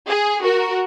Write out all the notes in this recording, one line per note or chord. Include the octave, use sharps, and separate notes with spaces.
G#4
F#4 A#4